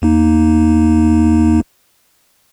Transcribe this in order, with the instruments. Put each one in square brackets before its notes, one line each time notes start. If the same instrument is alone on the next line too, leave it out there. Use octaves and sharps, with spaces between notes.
[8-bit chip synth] E2 A#3 D#4